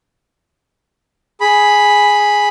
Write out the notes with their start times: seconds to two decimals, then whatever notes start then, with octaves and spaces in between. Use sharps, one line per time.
1.41 G#4 B5